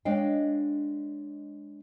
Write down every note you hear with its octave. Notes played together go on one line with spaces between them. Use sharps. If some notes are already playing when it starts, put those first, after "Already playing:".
G#3 D4 C#5 D#5 F5 G5